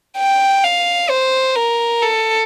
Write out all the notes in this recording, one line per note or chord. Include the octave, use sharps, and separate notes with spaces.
G5
F5
C5
A#4
A4